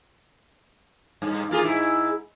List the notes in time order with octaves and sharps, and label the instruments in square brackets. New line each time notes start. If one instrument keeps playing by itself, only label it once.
[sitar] G2
A#3 F4 G#4
G#2 E4